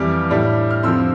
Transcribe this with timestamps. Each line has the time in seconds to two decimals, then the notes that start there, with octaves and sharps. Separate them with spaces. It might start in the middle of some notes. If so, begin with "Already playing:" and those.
Already playing: F2 E3 G3 D6 F6
0.30 A2 G3 D4
0.71 F6
0.83 F2 D3 F3 C4 C6 E6